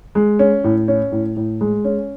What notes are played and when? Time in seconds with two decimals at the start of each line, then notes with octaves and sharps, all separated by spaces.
0.15 G#3
0.39 C#4
0.64 A2
0.88 C#4
1.12 A2
1.37 A2
1.61 G#3
1.85 C#4